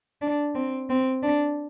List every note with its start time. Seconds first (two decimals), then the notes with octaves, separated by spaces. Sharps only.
0.22 D4
0.55 C4
0.90 C4
1.23 D4